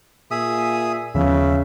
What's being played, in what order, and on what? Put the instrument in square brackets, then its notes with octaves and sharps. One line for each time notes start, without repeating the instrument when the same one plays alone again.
[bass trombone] A#2 [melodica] G#4 E5 D#6
[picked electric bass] D#2 F3 B3 [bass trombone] C#3 [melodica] E5